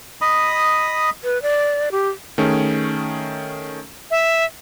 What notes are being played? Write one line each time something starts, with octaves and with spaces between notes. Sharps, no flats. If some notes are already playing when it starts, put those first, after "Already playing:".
D#5 B5 D#6
B4
D5
G4
D#3 A3 C#4 G#4
E5